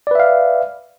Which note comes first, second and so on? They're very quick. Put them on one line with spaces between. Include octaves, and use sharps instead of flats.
D5 B4 E5 F5